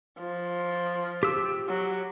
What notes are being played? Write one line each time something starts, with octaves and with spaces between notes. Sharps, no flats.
F3
G4 E6
F#3